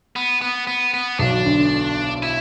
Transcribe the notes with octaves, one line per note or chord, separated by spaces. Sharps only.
B3
B3
B3
B3
B1 B2 D4
D2 D3
E4